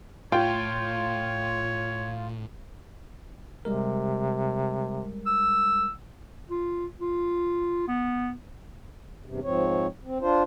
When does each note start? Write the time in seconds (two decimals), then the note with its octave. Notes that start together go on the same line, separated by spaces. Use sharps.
0.32 A2 F4 C#5 G5
3.65 C3 G3 G#3 A#4
5.26 E6
6.50 F4
7.00 F4
7.88 B3
9.26 E2 G2 C3
9.44 G#2 F3 C4 C#5
10.04 C4
10.21 D4 F4 C5